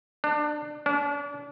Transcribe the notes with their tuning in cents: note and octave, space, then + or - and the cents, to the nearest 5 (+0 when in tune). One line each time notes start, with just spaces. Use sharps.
D4 +25
D4 -35